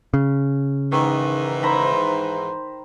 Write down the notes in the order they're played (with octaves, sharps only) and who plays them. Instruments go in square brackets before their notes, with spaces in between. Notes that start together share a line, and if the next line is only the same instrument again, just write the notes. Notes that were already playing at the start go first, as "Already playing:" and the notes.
[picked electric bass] C#3
[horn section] G#2 E3 [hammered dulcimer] D#3
[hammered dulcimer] C5 A#5 B5